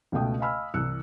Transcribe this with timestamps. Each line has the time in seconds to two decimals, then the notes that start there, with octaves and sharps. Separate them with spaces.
0.12 C#2 B2 A3 G5 D#6
0.40 D#5 F5 G#5 B5 E6 F6
0.74 C2 E3 E6 F#6 C#7